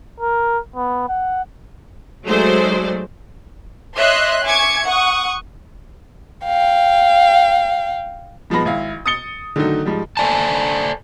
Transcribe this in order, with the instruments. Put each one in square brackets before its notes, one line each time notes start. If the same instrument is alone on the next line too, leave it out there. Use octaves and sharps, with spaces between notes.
[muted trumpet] A#4
B3
F#5
[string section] F#3 G#3 A3 D#4 C5 D5
[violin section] C#5 D#5 E5 C6 F#6
E5 G#5 C#6 D6 G#6 C#7
F#5 C#6 D#6
[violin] F5 G5
[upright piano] G#2 F3 G#3 B3 B5 A#6
G#1 E4 F5
D#6 A6 C#7 G7
D3 D#3 F#3 A3 D#4
G#2 F3 G3
[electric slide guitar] A4 C5 D5 G#5 A5